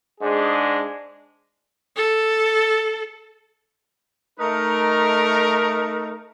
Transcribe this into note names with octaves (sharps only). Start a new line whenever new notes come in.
G#2 G#3 D4 G#4
A4
A3 D#4 A#4